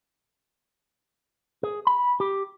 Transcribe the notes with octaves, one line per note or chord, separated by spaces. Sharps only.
G#4
B5
G4